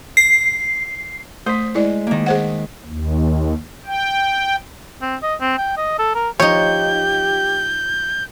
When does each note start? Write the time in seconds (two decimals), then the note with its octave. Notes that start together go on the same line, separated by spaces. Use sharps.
0.17 C7
1.46 A3 C5 D#6 B6
1.75 G#3 E4 D5
2.07 D#3 A#3
2.26 G#4 C5 F#5
2.85 D#2
3.86 G5
5.01 C4
5.22 D#5
5.41 C4
5.57 G5
5.77 D#5
5.99 A4
6.15 A#4
6.40 F3 D#4 G4 C#5 G6